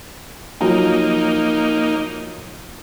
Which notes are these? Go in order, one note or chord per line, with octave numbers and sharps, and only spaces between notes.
F3 F#3 A#3 D#4 A#5